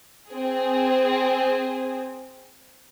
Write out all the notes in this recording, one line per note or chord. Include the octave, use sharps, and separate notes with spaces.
C4 G#4